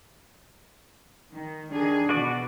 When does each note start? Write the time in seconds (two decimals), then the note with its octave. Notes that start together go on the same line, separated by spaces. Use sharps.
1.32 D#3
1.71 D#3 D4 G#4
2.09 B2 E3 F#4 B4 D5